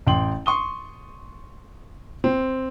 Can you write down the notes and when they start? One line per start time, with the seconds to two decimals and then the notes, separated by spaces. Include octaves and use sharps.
0.07 A1 G5 C6 F#7
0.46 C6 C#6 D#6 G7
2.24 C4